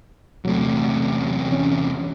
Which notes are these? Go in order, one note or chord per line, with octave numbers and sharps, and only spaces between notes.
E2 C3 F#3 A3
E3 C#4